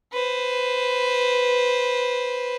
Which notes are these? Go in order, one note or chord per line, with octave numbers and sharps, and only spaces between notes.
B4 C5